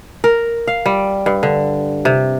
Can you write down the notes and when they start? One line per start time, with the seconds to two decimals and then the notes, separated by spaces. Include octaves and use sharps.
0.24 A#4
0.68 F5
0.86 G3
1.26 G2
1.43 D3
2.05 C3